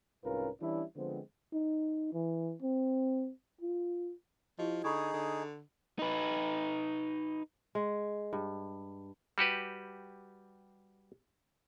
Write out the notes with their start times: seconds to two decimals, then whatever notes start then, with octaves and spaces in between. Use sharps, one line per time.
0.24 C2 G#2 C#4 F4 A#4 B4
0.61 E3 G3 C#4 D4 E4
0.96 D3 F3 G#3 B3 C4
1.53 D#4
2.13 E3
2.62 C4
3.61 F4
4.59 F3 E4 G4 D#5
4.84 D3 D#4 G#4 B5 C#6 G#6
5.13 D3
5.99 D#4 B4
7.75 G#3
8.33 G2
9.38 G3 F#4 G4 B4